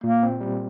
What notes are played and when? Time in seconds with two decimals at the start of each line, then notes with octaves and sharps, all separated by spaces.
0.04 A#2 A#3
0.23 C4
0.41 G3